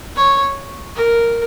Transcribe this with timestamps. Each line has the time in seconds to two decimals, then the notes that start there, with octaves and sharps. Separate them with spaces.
0.16 C#5
0.96 A#4